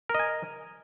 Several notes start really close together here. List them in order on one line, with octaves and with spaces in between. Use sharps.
A#4 D#5 G#5